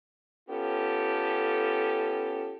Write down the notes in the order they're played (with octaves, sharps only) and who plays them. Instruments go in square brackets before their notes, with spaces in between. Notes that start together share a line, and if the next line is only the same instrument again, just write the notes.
[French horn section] B3 C#4 F4 G4 A4